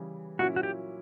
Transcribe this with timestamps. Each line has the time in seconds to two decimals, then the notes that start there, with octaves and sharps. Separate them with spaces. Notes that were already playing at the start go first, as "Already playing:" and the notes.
Already playing: C#3 E3 G3
0.39 A#2 F#3 C#4 E4 F#4
0.56 F#4
0.63 G4